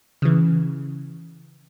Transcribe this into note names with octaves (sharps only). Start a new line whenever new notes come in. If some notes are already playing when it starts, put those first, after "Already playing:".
C#3 E3